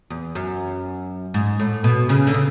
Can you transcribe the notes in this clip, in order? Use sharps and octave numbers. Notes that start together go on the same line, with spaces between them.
E2
F#2
G#2
A2
B2
C#3
D3
C#3